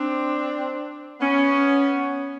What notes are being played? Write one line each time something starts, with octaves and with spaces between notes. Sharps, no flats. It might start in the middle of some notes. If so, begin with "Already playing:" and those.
Already playing: C4 D4
B3 C#4